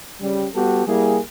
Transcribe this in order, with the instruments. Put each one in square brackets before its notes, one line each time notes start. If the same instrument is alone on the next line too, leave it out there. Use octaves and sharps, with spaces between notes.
[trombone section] C#3 G3
G3 B3 F#4 G4 A4
G3 A#3 E4 G#4